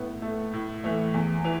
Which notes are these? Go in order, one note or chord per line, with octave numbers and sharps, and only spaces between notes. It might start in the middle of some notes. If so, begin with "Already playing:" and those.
Already playing: A2 B3
A3
A2
E3 A3
E2
E3